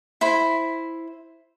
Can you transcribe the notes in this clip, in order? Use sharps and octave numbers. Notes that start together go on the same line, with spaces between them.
E4 C5 B5